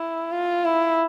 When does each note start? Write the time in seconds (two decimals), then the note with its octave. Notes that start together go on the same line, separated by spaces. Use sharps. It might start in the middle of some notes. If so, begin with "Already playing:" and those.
Already playing: E4
0.31 F4
0.64 E4